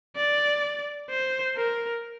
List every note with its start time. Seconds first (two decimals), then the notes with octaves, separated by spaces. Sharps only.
0.17 D5
1.10 C5
1.57 A#4